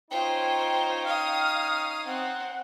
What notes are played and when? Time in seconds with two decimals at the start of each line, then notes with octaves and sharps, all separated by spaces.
0.11 C#4 D#4 F4 C5 G5
1.05 F5 D#6 F6
2.06 C4 F#5